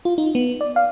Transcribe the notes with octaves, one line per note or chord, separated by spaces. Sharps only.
F4
D#4
B3
D5
F5